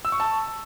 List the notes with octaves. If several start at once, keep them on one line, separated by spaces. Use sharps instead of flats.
E6
C#6
A5